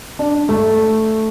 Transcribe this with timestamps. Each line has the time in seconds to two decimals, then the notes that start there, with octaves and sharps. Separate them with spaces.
0.19 D4
0.49 A3